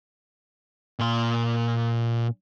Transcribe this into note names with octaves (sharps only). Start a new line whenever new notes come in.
A#2 C6